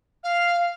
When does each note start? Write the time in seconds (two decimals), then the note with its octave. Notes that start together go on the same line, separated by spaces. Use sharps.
0.23 F5